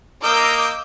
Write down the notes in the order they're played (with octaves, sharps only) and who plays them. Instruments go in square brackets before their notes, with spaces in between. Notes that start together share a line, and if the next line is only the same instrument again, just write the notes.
[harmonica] A#3 A#4 D#5 [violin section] D6 E6 G6